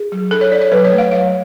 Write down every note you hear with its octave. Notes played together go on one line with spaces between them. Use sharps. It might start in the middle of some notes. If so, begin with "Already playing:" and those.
Already playing: G#4
F#3
D4 A4
C#5
D4 D5
C#5
F#3 B4
C#5
A3
F5
F#3 F5